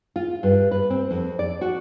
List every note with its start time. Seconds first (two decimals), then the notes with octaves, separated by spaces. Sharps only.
0.16 F4
0.43 G2
0.71 B4
0.90 C4
1.11 F2
1.39 D5
1.61 F#4